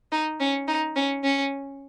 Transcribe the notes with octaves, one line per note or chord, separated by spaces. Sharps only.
D#4
C#4
D#4
C#4
C#4